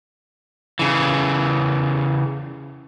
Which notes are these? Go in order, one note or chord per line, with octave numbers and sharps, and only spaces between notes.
C#3 E3